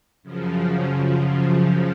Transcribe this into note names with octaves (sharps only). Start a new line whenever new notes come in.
F#2 C#3 F3